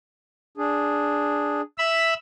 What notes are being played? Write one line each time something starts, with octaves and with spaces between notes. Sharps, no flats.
D4 G#4
E5 B5 E6